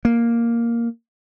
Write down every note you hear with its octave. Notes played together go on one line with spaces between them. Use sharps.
A#3